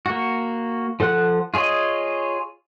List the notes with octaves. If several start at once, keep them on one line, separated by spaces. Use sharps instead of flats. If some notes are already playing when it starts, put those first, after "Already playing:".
A#3 F#4
F3 A4 F#5 F#6
F4 G#4 C#5 D#5